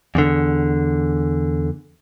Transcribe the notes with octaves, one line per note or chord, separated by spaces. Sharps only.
E2 D3